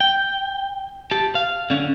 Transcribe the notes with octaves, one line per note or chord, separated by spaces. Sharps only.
G5
G4 A5
F5
D3 C#4